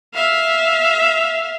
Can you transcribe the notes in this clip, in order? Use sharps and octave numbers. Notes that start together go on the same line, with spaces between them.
E5 F5